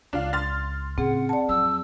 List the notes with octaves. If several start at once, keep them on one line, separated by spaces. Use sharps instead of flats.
C#2 D4 F4 F5
C6 F6 A6
A2 C#3 C4 G#4 F#5
D5 A5
F2 F#3 E6